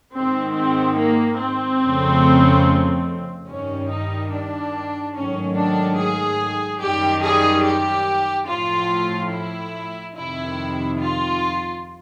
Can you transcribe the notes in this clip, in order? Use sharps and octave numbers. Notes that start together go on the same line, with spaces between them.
G#2 D#3 G#3 C4
C4
A#3
C4
F2 C#3 F3 A3
G2 D#3 G3 C#4
D#4
D4
G#2 D#3 F#3 A3 C#4
D4
G#4
F#2 D#3 G3 G4
G#4
G4
A2 F3 A3 F4
E4
F2 C3 D#3 E4
F4